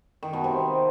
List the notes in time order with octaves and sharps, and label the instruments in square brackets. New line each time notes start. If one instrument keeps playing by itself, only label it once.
[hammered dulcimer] D#3
B2
C3